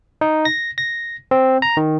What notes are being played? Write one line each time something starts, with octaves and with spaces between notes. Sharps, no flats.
D#4
A#6
A#6
C4
A#5
D#3